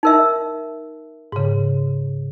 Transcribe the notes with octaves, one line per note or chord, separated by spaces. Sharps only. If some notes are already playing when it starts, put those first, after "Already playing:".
D#4 A#4 E5
G#2 C#3